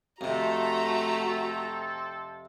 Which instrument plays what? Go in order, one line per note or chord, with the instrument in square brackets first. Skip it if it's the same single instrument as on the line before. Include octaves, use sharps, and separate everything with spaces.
[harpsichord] F2 C3 [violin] A3 A#5 [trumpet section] C4 A4 [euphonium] F#4